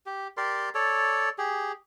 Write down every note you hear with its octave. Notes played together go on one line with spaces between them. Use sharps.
G4
G4 A#4 D5 C6
A4 C#5 D5
G4 G#4